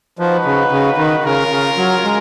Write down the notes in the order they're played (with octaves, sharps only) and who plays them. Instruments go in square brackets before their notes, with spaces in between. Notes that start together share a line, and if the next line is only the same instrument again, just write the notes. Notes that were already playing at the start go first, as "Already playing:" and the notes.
[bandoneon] F3 [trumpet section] D#4 F#4 B4
[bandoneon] C#3
C#3
D#3
[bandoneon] C#3 [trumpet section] C#4 F4 A#4
[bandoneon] C#3
F#3
G#3